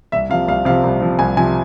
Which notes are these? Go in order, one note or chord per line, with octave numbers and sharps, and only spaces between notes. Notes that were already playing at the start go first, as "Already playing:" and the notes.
C2 E5
C3 F3 F5
C2 F5
C3 F3 F5
C2
C3 F3
C2 G#5
C3 F3 G#5